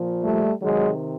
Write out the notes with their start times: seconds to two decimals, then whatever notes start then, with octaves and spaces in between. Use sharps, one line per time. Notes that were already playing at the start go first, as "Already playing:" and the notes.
Already playing: A#2 F3
0.22 G3 A3
0.62 C3 D#3 F#3 G#3